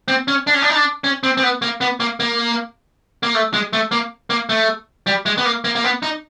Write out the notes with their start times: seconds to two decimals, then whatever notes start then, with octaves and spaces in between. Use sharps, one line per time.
0.08 C4
0.28 C#4
0.47 D4
0.54 C#4
0.62 D4
0.69 D#4
0.75 D4
1.04 C#4
1.23 C4
1.37 C4
1.43 B3
1.62 A#3
1.81 B3
2.00 A#3
2.20 A#3
3.23 A#3
3.35 A3
3.54 G#3
3.73 A3
3.91 A#3
4.30 A#3
4.49 A3
5.07 G3
5.26 G#3
5.38 B3
5.45 A#3
5.64 A#3
5.75 A#3
5.84 B3
6.02 D#4